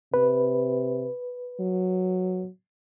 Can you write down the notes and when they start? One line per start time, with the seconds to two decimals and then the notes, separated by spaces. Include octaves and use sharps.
0.14 C3 B4
1.60 F#3